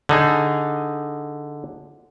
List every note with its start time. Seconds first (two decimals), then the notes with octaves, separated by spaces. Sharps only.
0.09 D3 D#4 G#4